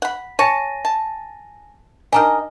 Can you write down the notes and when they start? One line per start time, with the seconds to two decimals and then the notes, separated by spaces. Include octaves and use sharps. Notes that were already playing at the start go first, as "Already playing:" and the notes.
0.02 F#5 B5
0.39 C#5 G#5 A5 A#6 D#7
0.85 A5
2.12 D#3 D4 D#5 G#5 A#5 F6